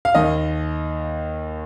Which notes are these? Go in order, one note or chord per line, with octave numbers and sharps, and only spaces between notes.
F5
D#2 D#3 D#5